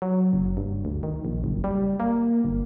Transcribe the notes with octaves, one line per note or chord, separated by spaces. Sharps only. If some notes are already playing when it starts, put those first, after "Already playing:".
F#3
F#1
G2
D2
D#3
A#1
F#1
G3
A#3
G1